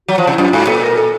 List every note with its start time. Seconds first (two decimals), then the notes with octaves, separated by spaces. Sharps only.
0.08 F#3 F#4
0.18 F3
0.23 C3 F4
0.32 E4
0.38 F#2 F4
0.53 G#2 F#4
0.67 A#2 A4
0.82 A#4
0.96 A4